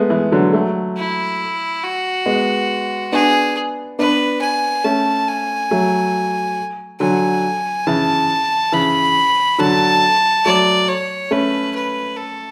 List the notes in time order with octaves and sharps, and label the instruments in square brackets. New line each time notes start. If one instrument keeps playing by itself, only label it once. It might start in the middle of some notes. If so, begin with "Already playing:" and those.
Already playing: [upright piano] G#3 A3 B3
E3 G#3
D3 F#3
F#3 A3
[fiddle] E4
F#4
[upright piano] G#3 B3
[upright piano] B3 D4 [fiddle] G#4
[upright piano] B3 D4 [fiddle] B4
[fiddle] G#5
[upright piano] A3 C#4 [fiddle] A5
[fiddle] G#5
[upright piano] F#3 A3
[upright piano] D3 F#3 [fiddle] G#5
[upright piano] C#3 E3 [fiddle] A5
[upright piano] C#3 E3 [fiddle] B5
[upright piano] D3 F#3 [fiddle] A5
[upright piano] F#3 A3 [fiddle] D5
[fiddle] C#5
[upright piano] A3 C#4 [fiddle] B4
[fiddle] B4
A4